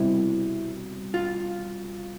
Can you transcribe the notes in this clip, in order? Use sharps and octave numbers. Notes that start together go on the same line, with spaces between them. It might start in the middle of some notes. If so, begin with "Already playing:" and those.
Already playing: C2 B2 G3 C4 E4
F4